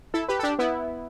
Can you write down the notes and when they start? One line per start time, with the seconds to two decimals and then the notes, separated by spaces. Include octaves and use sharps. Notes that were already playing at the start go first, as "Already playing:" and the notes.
0.14 E4 A4
0.28 G4 B4
0.39 A4
0.43 D4 G4
0.59 B3 E4